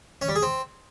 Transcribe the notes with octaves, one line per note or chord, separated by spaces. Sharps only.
C#4
G3
G#4
C4